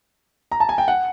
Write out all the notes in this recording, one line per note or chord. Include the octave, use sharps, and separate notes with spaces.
A#5
A5
G#5
G5
F#5